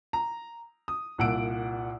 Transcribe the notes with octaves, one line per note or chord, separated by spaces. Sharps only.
A#5
D#6
C2 A#2 F#5 E6 D7